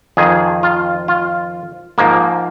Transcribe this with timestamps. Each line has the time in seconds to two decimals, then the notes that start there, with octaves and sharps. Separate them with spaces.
0.17 F2 D#3 G#4
0.63 F4
1.08 F4
1.98 G#2 F3 A#3